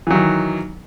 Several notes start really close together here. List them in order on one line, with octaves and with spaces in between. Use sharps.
E3 F#3 D#3